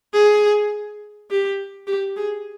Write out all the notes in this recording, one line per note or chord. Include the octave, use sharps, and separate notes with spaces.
G#4
G4
G4
G#4